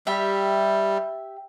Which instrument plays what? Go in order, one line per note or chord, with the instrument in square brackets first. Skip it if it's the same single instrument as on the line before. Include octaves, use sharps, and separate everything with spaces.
[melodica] G3 [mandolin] G4 E5